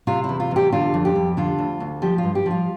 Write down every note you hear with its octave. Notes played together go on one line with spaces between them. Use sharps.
C3 F4
E4
E2
F4
E2 G4
D3 F4
F2
G4
F2
D3 F4
D2
D2
F3 G4
F4
G2
G4
F3 F4